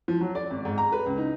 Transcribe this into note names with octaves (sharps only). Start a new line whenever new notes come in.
F3
F#3
D5
G#1
G#2
A#5
B4
C#2
D#4